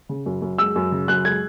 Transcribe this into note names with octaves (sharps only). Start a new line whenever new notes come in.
C#3
F#2
F#2
G#3 E6
F#2
C#3
F#2 F#6
G#3 G#6